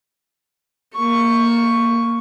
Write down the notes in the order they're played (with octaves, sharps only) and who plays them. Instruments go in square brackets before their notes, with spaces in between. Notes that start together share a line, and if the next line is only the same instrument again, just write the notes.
[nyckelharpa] A#3 C#6